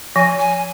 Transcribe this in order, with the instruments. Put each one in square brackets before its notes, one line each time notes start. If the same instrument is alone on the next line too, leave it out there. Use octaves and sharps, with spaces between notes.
[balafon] F3 [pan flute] G#5
[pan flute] G#5